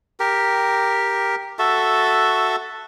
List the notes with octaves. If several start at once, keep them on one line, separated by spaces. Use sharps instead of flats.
G4 A#4
F#4 A4 E5